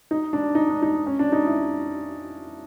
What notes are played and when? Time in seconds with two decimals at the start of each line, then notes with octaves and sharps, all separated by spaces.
0.11 D#4
0.33 D4
0.55 D#4
0.69 D4
0.82 D#4
1.06 C#4
1.19 D4
1.32 D#4
1.46 E4